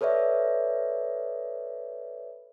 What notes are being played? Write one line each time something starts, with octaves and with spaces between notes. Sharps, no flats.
A4 B4 C#5 D5 E5